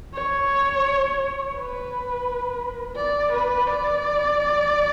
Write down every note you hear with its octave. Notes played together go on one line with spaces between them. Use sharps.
C#5
B4
D5
B4
D5